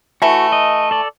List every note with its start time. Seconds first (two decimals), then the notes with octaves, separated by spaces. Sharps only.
0.22 E3 A3 F#4
0.52 D#5
0.91 A4 D5